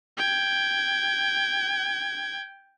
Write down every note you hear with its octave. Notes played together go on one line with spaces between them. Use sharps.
G5 G#6